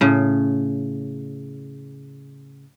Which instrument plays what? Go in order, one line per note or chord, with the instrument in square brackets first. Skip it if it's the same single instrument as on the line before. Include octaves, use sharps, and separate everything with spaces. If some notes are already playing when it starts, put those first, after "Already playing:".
[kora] A2 C#3